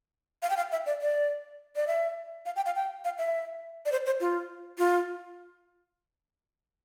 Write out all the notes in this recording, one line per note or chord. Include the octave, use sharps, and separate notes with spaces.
F5
G5
F5
E5
D5
D5
D5
E5
F5
G5
F5
G5
F5
E5
D5
C5
C5
F4
F4